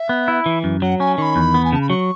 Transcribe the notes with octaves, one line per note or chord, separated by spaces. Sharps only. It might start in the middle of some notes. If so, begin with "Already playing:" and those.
Already playing: E5
B3
E4
E3
F#2
F#3 F#5
C#4 G#5
D#3 B5 C#6
E2
B3
G#5
C#3 A5
B5
F#3 C#6